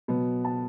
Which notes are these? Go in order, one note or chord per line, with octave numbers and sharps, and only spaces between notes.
B2 F#3 B3
A5